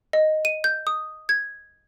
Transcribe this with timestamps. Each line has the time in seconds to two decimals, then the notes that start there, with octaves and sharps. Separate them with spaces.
0.13 D#5
0.45 D#7
0.64 G6
0.87 D#6
1.29 G#6